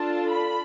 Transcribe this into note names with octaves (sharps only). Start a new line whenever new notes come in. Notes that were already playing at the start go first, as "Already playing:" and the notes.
Already playing: D4 F4 A4 A5
B5